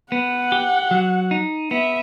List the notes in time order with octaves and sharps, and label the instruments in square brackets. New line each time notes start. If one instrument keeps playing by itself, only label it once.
[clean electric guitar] B3 [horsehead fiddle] F#5
[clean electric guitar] G4
F#3
D#4
[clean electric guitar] B3 [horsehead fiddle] E5